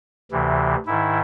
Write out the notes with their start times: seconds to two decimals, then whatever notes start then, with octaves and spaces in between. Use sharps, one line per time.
0.31 D2 C3 E3
0.86 G#2 D#3 E4